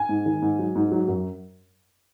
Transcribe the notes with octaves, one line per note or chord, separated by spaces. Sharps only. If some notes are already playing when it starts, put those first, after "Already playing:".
Already playing: G#5
G#2
D#3
G#2
F#3
G#2
F#3
F#2